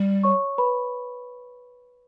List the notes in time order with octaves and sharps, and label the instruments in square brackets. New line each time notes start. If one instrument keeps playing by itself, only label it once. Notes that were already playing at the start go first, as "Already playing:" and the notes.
Already playing: [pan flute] G3
[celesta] C#5 C#6
B4 B5